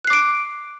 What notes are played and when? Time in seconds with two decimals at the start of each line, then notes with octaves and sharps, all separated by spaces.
0.05 F#6
0.07 C7
0.10 D6
0.13 D7